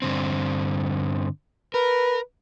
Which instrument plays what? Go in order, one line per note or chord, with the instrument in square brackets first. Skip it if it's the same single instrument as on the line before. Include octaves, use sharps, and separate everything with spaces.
[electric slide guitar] G2 D3 C4
[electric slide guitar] A#4 [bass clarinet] B4